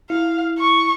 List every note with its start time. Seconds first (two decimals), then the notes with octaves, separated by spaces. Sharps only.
0.10 E4 F5
0.59 C#6